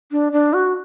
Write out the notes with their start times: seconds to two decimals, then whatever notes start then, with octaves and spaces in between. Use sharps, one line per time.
0.12 D4
0.32 D4
0.53 F#4